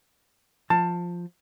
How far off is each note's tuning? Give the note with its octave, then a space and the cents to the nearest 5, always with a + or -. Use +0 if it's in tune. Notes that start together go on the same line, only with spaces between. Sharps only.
F3 +0 A5 +15